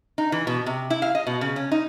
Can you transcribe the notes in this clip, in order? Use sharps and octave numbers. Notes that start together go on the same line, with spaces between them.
D#4
E3
B2
C3
E4
F5
D#5
B2
C#3
C#4
D#4